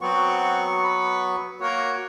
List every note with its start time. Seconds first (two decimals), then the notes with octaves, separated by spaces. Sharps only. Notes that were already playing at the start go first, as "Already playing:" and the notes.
0.01 F#3 B3 C4 F#4 C#6
0.83 B4
1.60 A#3 F#4 A#4 C#5